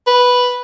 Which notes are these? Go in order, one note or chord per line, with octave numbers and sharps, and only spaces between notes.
B4